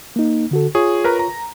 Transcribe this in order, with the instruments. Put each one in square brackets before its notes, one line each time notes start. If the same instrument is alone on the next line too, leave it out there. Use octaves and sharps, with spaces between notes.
[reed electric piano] A#3 D#4
D3 F#4 A4
[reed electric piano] F4 C#5 C#6 [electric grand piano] G#4
[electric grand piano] A#4 B4 A#5
A#5